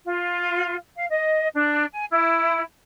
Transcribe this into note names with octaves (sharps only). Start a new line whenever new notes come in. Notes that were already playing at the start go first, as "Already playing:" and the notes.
F4
F5
D#5
D4
G#5
E4